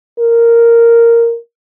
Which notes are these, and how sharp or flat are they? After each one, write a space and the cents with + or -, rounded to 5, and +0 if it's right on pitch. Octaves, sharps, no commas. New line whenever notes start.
A#4 -5